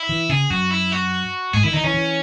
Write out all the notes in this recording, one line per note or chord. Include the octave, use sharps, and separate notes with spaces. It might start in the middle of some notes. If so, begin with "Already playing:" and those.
Already playing: E4
E3
C#3 G#4
F#2 F#4
E4
F#4
G#2 G#4
D#3 E4
D#3 D#4
E3 C#4
E3